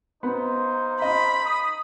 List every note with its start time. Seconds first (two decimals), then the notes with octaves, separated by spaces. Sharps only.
0.23 A#3 B3 D#4 C5
1.02 D#5 B5
1.45 D#4 D#6